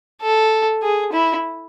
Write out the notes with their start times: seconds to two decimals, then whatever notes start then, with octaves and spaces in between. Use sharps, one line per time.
0.22 A4
0.82 G#4
1.13 E4